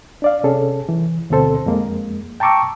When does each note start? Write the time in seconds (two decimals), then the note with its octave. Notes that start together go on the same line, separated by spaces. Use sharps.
0.22 D4 D5 F5
0.44 C3 C#4 G#4 A4
0.89 E3
1.30 D2 B2 D3 C4 A4 C5
1.66 F2 G#3 A#3
2.40 G5 A5 A#5 C#6 D6 E6